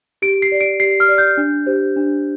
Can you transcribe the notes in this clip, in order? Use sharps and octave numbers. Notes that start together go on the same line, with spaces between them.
G4 D7
C7
D5
D7
G4 C7
F6
D5
G6
D4
G4 C5
D4